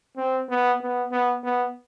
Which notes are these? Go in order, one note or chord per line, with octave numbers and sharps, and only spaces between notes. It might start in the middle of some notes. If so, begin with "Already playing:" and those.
C4
B3
B3
B3
B3